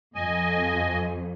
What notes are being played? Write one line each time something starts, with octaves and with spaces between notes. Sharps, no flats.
F2 D#5 G#5